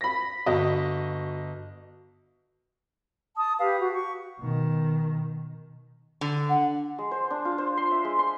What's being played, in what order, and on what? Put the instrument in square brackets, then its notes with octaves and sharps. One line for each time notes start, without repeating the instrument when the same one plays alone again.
[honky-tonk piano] B5 A#6 [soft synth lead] B6
[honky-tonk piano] G1 D#5 [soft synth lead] F#4
[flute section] A5 D#6
G4 B4 F5
F#4
C#6
[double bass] B2 D#3
[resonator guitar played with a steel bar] D3
[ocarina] F#5
[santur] G#3
C5
D4
F4
C5
C6
E5
G#3
C6